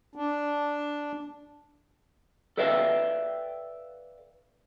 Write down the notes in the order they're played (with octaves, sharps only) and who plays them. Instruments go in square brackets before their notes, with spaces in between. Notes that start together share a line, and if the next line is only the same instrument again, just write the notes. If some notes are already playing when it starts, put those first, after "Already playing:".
[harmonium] D4
[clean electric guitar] A4 B4 D5 E5 F5 G5